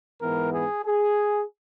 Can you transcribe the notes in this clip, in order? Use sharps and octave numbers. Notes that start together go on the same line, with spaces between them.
G#2 E3 B3 A#4
G#4
G#4